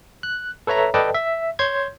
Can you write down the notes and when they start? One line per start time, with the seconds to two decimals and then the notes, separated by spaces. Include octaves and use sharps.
0.23 F#6
0.67 A4 B4 C#5 E5 A#5
0.94 A4 B4 D5 D#5 G5 A5
1.14 E5
1.59 C#5 C6 G6 G#6